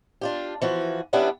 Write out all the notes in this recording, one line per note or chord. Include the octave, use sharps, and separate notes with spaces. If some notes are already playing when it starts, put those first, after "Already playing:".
D4 F4 G4
E3 F3 F#4
G3 B3 C#4 D4 E4 F#5